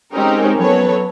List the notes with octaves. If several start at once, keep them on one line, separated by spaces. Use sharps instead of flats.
G#3 C4 C#4 D#4 G4 A#4
F#3 B3 A4 B4 C#5